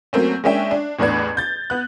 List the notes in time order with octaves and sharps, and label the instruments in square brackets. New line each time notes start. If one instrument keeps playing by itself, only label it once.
[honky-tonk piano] F#3 A3 A#3 C4 C#4
G#3 A#3 C#4 D4 E5 G5
D4
A1 E2 A2 D4 B4 G#6
G6 A6
B3 F#6